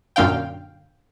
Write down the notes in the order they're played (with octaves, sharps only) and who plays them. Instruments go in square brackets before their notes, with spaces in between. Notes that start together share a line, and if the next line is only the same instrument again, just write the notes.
[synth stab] F#2 A#2 D3 F5 G5